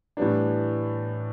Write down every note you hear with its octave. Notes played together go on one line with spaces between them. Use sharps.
A2 E3 G3 B3 D4